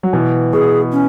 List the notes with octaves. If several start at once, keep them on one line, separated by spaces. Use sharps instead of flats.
F#3
B2 E3
B2 G#4
C#4